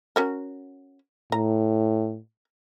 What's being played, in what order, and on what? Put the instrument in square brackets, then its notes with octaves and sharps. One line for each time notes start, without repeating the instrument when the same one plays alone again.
[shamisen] C#4 F#4 A#4
[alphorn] A2 [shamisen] A#5